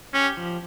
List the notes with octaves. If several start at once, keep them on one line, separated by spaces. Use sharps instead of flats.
C#4 G4
F3